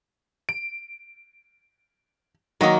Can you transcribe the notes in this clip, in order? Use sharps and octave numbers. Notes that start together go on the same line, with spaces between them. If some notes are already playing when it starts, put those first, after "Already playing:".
D7
D#3 F#3 A#3 F#4 D#5